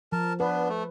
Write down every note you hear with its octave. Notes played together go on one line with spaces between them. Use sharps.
F3 A#4 A5
B3 D4 B4
A3